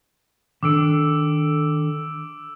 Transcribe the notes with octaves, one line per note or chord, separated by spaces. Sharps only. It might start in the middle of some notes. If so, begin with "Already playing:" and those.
D#3 D4 A4 D6 E6 D7